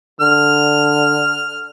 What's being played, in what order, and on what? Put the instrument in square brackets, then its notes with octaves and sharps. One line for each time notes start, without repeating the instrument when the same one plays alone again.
[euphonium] D3 [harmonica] F6